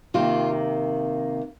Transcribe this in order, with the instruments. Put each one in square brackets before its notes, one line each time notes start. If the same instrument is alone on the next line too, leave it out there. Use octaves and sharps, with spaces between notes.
[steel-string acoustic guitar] C3 D#3 A#3 F4